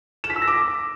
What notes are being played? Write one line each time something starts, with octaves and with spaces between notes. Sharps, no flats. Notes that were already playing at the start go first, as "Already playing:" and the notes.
E7
B6
E6
A#6
D6